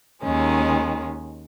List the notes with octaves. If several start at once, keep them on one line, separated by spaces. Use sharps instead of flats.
D#2 D#3 G#3 C#4